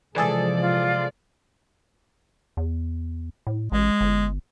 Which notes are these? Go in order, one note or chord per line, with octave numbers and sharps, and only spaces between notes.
C3 E3 F3 G#3 G#4 A4 D5
F4
E2
A2
A1 G#3
G1